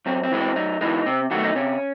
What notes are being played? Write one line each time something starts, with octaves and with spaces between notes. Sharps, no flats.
F#2 C4
C4
E3 G#3
C4
F#2 D#4
E3 G#3 D#4
C3 C4
D#3 F#3 A3 F#4
D#4
C3 C#4